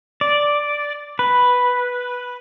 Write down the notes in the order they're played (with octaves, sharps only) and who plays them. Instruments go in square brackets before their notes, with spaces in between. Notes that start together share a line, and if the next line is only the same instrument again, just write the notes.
[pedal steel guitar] D5
B4